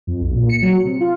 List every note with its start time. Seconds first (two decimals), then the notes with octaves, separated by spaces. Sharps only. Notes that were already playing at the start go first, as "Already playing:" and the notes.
0.07 F2
0.21 B1
0.35 A#2
0.49 C#7
0.62 F#3
0.85 C3
1.01 F4